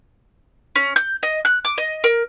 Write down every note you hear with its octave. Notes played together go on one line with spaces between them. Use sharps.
C#4
G6
D#5
F#6
D6
D#5
A#4